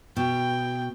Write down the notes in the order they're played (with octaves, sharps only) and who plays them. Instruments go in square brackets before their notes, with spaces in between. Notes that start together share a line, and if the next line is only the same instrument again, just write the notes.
[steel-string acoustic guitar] B2 [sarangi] G5